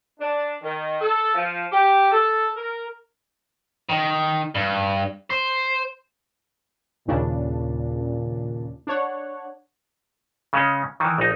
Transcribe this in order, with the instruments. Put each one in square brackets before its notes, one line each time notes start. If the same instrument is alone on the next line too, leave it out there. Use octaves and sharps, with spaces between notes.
[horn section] D4
D#3
A4
F3
G4
A4
A#4
[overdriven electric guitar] D#3
G2
C5
[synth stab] D#2 C#3 D4 [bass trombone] A#2
[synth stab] D4 C#5 F#5
[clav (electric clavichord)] C#3 G#3 C#4
D#3 E3
A#1 D#4